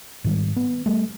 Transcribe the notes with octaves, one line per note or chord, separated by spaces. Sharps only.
G#2 D#3 G3
B3
G3 A3